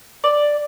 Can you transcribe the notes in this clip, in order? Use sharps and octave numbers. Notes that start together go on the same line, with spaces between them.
D5